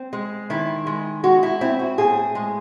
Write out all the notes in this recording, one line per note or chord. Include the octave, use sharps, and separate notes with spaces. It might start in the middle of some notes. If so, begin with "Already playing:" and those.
Already playing: C4
G#3
D#3 E4
G#3
G#3 F#4
E4
C4 E4
F#4
A2 G#4
G#3